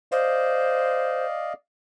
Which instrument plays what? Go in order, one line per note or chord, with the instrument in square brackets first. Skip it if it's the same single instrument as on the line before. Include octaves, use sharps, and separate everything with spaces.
[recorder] C5 [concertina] D5 D#5 F5